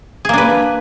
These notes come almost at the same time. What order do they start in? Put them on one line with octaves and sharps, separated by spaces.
G#4 A#3 D4 B4